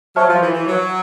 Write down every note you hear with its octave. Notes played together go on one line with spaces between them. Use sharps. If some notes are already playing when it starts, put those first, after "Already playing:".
F#3 C5 E5 A5 C#6 F6
F3
E3
E3
F#3